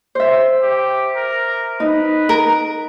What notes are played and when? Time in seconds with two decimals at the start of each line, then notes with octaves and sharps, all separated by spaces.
0.15 C5 E5
0.62 G4
1.16 A#4
1.80 D#4 B4
2.29 A#4